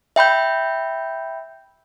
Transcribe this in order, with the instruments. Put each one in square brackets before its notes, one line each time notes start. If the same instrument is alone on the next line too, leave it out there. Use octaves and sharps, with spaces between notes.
[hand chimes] E5 G5 B5 G6